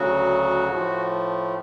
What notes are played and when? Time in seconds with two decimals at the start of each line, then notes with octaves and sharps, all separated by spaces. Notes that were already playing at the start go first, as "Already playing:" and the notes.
Already playing: D2 C#3 F#3 F#4
0.70 A2 F3 A3